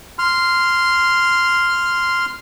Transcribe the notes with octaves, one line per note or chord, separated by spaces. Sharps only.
C6 F6